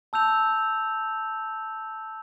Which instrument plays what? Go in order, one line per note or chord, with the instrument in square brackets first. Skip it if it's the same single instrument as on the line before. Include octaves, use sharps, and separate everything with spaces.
[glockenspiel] A5 E6 G6 F7